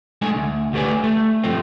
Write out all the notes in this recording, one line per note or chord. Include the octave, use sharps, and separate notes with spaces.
G#3 A3 D4 G#5
D2
D2 A3 G4 B4 D5 G#5
A3
G2 F3 A3 C4